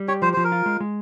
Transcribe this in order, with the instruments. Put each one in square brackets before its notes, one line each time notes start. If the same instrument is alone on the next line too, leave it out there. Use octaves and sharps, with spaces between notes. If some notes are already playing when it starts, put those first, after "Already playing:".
Already playing: [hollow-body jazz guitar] G3
[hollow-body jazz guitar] G4 [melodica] C#5
[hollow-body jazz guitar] F3 [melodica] C5
[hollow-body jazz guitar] F3 [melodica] C5
[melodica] A#4
[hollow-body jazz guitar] F4
G#3
G#3